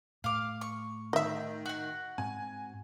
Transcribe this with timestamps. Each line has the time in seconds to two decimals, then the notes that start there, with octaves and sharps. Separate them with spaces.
0.24 A2 F5 D6
0.61 C#6
1.13 D#3 D#5 E5
1.66 F#4 F#5
2.18 G#2 C4 G#5